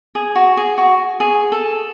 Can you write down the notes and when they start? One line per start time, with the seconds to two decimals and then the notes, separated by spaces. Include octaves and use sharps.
0.15 G#4
0.35 F#4
0.57 G#4
0.78 F#4
1.20 G#4
1.52 A4